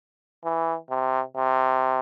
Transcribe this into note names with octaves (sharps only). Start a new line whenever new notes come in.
E3
C3
C3